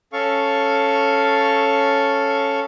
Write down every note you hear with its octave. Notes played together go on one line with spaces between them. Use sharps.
C#4 A4 F5 C#6